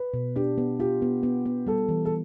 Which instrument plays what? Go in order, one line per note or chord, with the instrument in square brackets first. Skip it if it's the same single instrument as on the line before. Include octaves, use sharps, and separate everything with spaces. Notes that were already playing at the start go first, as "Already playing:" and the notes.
Already playing: [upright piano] B4
[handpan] B2
[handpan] D4 [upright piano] G4
[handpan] B3
[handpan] F4 [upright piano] G4
[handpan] B3
B3
B3
[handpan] G3 [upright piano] A4
[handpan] E3
[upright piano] A4